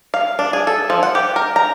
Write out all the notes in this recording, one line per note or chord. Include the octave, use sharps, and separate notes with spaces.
F5
D4
G#4
A4
F3
F#5
G4
A#4
A#5